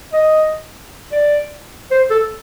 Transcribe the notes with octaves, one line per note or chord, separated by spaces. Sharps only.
D#5
D5
C5
A4